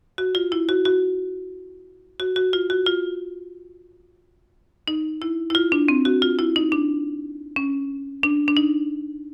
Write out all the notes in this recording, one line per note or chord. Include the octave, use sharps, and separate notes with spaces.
F#4
F4
E4
F#4
F#4
F#4
F#4
F4
F#4
F4
D#4
E4
E4
F4
D4
C4
F#4
F4
E4
D#4
D4
C#4
D4
D4
D#4